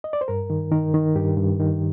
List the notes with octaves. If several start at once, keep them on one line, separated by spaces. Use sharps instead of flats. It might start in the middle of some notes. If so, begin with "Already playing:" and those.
D#5
D5
C5
G2 A#4
D#3
D#3 A#4
D#3
G2 G4
G2
D#3